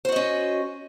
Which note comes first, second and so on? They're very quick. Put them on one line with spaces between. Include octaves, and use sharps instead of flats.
C5 F#4 D#5 C#4